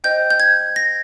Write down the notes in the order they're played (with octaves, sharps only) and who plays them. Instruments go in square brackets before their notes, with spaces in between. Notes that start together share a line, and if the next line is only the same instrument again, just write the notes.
[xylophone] C5 D#5 G5 G6
G6
G#6
A#6